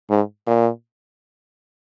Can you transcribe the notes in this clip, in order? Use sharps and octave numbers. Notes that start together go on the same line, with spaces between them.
G#2
A#2